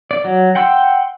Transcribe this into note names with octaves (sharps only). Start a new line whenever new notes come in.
D5
F#3
F#5 G5 C6 E6